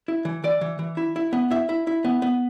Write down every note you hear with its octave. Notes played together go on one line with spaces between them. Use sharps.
E4
E3
E3 D5
E3
E3
E4
E4
B3
E4 E5
E4
E4
B3
B3